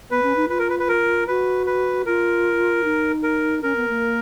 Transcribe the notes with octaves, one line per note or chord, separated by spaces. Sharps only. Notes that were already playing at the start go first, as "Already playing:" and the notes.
B3 B4
C#4
D#4
F4 B4
A#4
B4
B4
A#4
F#4 B4
B4
F4 A#4
D#4
A#4
C#4 A#4
B3
A#3